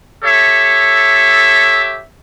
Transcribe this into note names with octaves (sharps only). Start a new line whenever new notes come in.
G4 A4 C#5 E5